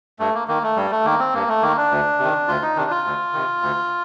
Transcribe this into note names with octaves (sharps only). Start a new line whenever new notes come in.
G2 A3
A#3
D#3 A#3
A3
G2 G3
A3
D#3 A#3
C4
G2 A#3
A3
D#3 A#3
D4
D2
C3 D#3
D2 F4
D#4
C3 D#3 D4
F4
D2
C3 D#3
D2